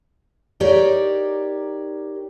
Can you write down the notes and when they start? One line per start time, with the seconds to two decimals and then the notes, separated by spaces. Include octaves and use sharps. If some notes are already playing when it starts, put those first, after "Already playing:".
0.60 D#4 G4 A#4 C#5 D5